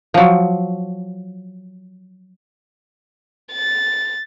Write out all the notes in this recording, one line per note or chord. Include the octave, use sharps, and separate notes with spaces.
F3 F#3
A6